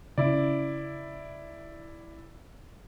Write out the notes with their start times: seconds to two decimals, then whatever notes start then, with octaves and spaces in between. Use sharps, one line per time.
0.18 C#3 C#4 E4 D5